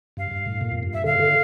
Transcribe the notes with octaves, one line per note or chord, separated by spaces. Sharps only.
G2 F5
G2
A2
A#2
F2
G2
E5
D3 F5
D3